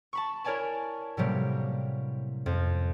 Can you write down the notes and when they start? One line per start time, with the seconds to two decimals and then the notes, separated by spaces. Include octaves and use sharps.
0.13 A5 B5 C#6
0.44 E4 A#4 C#5 D5 G#5 A5
1.17 A2 C3 F#3 G3 A#3
2.46 F2